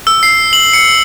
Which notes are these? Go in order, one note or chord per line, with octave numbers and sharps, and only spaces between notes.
E6
C7
F#7
C#7